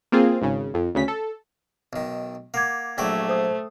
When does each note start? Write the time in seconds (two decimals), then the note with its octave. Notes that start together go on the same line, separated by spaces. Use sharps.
0.12 A#3 C4 F4 G#4
0.41 G#1 C#3
0.74 F2
0.95 D2 C#3 B6
1.08 A4
1.93 B1 D#3
2.54 A#3 F#5 D6 G#6
2.98 A#1 F#3 A3 D5 G5 C#6 E6
3.29 C5 D#6